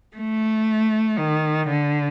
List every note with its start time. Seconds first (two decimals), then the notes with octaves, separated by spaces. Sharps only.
0.16 A3
1.18 D#3
1.68 D3